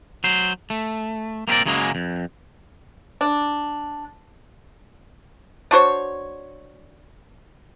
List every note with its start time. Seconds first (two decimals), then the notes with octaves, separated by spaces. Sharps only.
0.24 F#3 C5
0.70 A3
1.48 A#3 C4 E4 A#4 D5
1.66 F#2 C#3 F#3 G#3 A#3
1.95 F2
3.21 D4
5.71 D4 F#4 C5 C#5